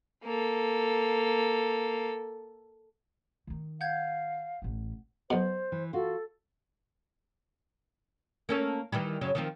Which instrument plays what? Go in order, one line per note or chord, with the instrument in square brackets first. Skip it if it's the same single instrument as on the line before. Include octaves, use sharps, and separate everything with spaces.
[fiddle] A#3 A4
[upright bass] D#3 D#4
[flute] F5 [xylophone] F#5 G6 G#6
[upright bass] A1 E3
[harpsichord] B1 B2 [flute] C5
[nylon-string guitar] E3
[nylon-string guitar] F4 F#4 [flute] A4
[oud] A#3 C#4 A4
D#3 E3 G3
F#2 C#3 F#3
D#3 F3 C4